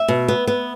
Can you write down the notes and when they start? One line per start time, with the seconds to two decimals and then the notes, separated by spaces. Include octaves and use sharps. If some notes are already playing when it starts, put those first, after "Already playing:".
Already playing: E5
0.08 B2
0.28 B3
0.47 B3